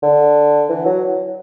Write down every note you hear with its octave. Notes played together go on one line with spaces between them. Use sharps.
D3
E3
F#3